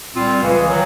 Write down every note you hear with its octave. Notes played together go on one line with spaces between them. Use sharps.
C2 A#2 G3 C4 F4
C#2 C#3 E3 G#3
D#3 F#3